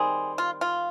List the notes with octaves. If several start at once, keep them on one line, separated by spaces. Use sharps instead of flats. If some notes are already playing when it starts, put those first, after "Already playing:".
Already playing: D#3 G3 C4 G#4
F4
F4